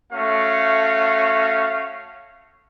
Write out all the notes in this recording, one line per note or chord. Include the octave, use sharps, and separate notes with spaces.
A3 C#4 F#4 F5